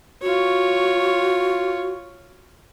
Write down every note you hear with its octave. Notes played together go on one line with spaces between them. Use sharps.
F4 F#4 C#5